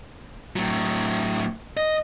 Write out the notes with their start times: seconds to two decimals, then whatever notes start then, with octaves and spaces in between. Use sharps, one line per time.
0.56 A2 F#3
1.77 D#5